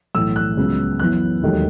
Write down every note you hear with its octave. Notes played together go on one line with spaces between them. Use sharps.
B1 A2 E3 E6
F#6
C#2 C#3 F#3 B3
F#2 E3 B3 F#6
E1 D#2 D#3 F#3 A3